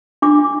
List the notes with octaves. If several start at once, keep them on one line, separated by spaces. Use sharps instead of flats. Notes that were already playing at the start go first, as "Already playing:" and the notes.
D4 D6